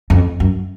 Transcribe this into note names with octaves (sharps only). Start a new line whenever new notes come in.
F2
F#2